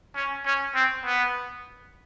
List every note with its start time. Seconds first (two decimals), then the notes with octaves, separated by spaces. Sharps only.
0.16 C#4
0.46 C#4
0.75 C4
1.05 B3